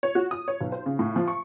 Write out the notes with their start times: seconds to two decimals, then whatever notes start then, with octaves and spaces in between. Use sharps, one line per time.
0.03 C#5
0.15 F#4
0.31 D#6
0.48 C#5
0.61 B1
0.72 C5
0.86 C#3
0.99 A2
1.16 F3
1.28 C#6